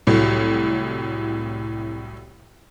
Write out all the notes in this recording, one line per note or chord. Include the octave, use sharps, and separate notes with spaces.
C2 A2 F#3